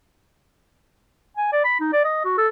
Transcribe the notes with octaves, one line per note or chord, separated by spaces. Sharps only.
G#5
D5
B5
D#4
D5
D#5
F#4
A4